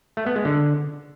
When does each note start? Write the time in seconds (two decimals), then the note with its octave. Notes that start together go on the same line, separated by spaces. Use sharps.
0.17 A3
0.26 B3
0.36 G#3
0.45 D3